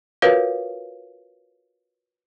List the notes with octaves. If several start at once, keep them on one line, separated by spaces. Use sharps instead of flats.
F4 F#4 A#4 B4 C#5 F5